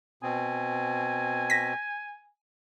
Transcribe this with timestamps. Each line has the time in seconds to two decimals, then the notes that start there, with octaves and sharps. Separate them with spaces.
0.23 B2 C4 G#5
1.50 A#6 B6